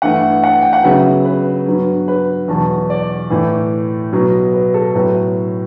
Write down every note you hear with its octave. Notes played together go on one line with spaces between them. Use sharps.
G2 E3 A3 F#5
F#5
G5
F#5
C#3 F#3 B3 E5
B4
G2 F#3 B3
B4
E2 B2 F#3 A5
D5
A2 E3 A3
B2 F#3 B3
B4
A4
A2 F#3 B3 B4